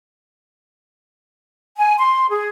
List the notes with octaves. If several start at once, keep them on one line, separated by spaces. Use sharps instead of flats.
G#5
C6
G#4